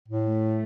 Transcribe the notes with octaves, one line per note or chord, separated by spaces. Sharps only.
A2
A3